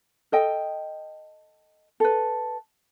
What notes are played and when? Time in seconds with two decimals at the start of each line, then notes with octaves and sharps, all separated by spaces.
0.32 A4 D#5 G5
2.00 A4 B4